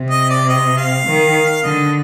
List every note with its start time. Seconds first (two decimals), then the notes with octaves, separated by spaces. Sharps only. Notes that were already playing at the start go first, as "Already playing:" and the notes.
Already playing: C3
0.10 D#5
0.30 D5
0.49 D#5
0.77 F5
1.06 D#3
1.64 D3 D#5